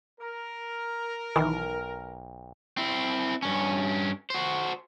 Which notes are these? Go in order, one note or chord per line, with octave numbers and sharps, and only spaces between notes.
A#4
B1 D#3 E3
C4 E4
G2 C#4
F#4 C5